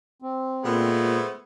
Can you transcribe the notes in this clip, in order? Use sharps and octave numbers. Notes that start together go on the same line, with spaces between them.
C4
A#2 G#3 A3 B3
C5